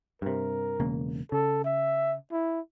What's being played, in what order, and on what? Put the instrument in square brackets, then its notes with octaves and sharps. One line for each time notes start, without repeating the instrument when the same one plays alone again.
[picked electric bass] G2 C3 [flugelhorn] A#4
[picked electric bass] E1 C#3 A#3
[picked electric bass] C#3 [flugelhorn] A4
[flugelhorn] E5
E4